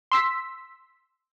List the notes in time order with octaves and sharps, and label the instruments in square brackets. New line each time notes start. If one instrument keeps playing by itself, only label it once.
[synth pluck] C6 E6 B6